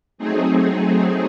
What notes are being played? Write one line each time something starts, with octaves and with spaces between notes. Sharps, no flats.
F#3 A3 C4 D#4 G#4